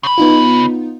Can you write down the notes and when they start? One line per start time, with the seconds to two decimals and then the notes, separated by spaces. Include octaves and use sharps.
0.03 C#3 B5
0.18 B3 D#4 F4